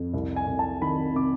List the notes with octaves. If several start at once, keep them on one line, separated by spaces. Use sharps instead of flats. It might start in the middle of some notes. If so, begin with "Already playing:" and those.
Already playing: F2
C2
G#5
C2
A5
D#3 B5
C3 D6